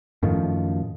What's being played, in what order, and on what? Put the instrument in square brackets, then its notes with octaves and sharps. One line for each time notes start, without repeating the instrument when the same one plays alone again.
[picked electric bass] F#2 A2 D#3 F3